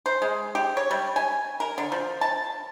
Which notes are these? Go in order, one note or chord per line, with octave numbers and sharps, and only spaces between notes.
C5
G#3
G4
C#5
G3
G#5
A#4
D3
F3
A5